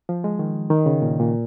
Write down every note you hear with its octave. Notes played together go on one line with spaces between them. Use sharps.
F3
G#3
D#3
D#3
C#3
A#2
A#2